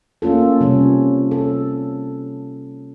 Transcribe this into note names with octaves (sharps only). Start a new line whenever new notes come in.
A#3 C#4 F4 A4
C3 G3 C#4
A4